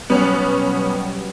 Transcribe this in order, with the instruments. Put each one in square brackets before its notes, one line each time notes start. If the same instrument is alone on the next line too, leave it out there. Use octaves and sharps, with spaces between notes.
[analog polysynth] B2 F#3 G3 [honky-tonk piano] B3 C#4